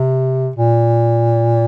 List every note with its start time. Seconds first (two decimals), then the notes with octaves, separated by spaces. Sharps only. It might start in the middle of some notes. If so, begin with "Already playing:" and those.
Already playing: C3
0.56 A#2